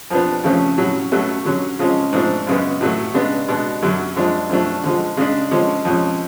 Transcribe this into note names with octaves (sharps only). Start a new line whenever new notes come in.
F2 F3 B3 D4
F2 C#3 F3 A3 C#4
A2 F#3 C#4
B2 F#3 A3 C#4
D3 F#3 C#4
C#3 F3 G#3 C#4
G#2 F3 A3 D4
F#2 C#3 G#3 B3
A2 F#3 A3
C#3 G#3 B3 D4
B2 G#3 D4
F#2 D3 F#3
F#2 F3 G#3 D4
F#2 F3 A3 D4
D3 F3 G#3
C#3 G#3 D4
D3 F3 G#3 C#4
F2 F3 G#3 C#4